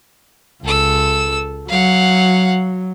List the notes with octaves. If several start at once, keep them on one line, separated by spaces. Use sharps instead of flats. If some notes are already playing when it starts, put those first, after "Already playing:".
C#2 A4 E6
F#3 F5 F#5